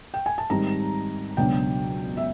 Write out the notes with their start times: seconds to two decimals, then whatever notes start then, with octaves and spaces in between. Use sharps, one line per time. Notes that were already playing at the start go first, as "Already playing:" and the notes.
0.14 G5
0.26 G#5
0.38 A5
0.50 G#2 D#3 G3 C4 D#4 A#5
1.37 C#2 B2 F#3 B3 D4 G5
2.17 E5